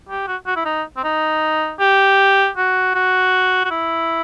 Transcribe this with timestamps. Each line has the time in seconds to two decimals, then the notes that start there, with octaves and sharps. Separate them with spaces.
0.09 G4
0.28 F#4
0.47 F#4
0.56 E4
0.65 D#4
0.97 C4
1.04 D#4
1.80 G4
2.57 F#4
2.95 F#4
3.65 F#4
3.71 E4